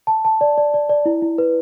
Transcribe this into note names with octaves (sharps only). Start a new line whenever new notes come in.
A5
A5
D5
D5
D5
D5
E4
E4
B4